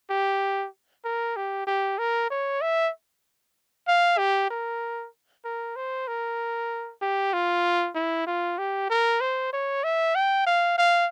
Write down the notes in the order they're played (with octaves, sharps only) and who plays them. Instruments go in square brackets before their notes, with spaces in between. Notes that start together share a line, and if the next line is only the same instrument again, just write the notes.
[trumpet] G4
A#4
G4
G4
A#4
C#5
E5
F5
G4
A#4
A#4
C5
A#4
G4
F4
E4
F4
G4
A#4
C5
C#5
E5
G5
F5
F5